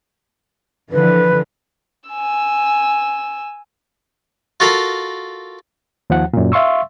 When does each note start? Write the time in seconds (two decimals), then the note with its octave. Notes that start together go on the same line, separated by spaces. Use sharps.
0.92 D3 E3 F3 B4
2.10 G#5 E6
4.60 F4 F#4 A4 A#4 F5 B5
6.10 D#2 F3 F#5
6.33 F#2 A#2
6.52 E5 F5 C6 C#6 E6